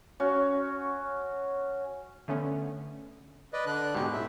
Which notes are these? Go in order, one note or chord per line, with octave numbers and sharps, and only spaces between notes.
C#4 F#4
D3 A3 B3 C#4
B4 D5 D#5
D3 D4 F#6
G#2 B2 G4
A2 E5